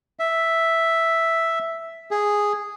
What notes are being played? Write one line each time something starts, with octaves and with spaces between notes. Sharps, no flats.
E5
G#4